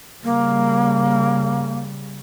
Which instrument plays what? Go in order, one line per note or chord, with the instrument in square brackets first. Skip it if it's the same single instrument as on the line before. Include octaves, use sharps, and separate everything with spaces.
[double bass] C#3 G3 [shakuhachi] A#3